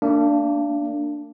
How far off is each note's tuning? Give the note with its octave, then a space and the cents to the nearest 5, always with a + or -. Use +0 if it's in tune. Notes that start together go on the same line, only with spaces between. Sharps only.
A#3 -35 D4 +0